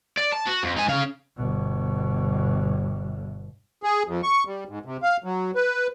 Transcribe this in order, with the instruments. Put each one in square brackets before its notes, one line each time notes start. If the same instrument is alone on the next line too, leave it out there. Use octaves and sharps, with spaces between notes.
[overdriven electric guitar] D5
A5
F#4
F2
D#4 G#5
C#3 F5
[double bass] G1 B2
[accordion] G#4
F2
C#6
G3
G#2
C3
F5
F#3
B4